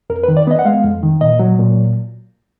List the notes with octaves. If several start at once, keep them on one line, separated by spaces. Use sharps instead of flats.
F2 A#4
B4
D#3
D5
B3 D#5
F#5
G#3 F5
F2
D#3
A#2 D#5
F#3
A#2